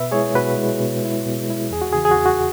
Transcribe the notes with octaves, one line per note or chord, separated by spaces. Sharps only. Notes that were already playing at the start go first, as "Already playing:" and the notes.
Already playing: B2 B4 E5
G#3 E4 G#4 C#5
B2 F#4 B4
G#3 E4
B2
G#3 E4
B2
G#3 E4
E2 G#4
F#4
C#3 E3 G#4
G#4
F#4
E2
F#4